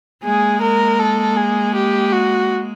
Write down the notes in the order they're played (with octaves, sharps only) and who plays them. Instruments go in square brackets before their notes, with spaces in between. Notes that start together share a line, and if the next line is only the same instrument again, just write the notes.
[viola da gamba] G#3 A#3 [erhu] G#4
[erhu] A#4
A4
G#4
G4
F#4